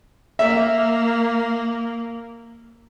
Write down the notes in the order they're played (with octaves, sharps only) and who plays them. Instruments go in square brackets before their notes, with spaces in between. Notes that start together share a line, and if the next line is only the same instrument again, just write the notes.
[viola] A#3 [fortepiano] E5